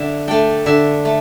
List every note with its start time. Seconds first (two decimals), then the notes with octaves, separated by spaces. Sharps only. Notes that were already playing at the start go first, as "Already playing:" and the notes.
Already playing: D3 E5
0.27 A3 D4 G5
0.66 D3 E5
1.05 A3